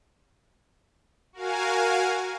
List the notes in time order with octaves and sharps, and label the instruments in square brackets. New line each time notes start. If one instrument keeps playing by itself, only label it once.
[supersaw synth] F#4 A#4 F5 G#5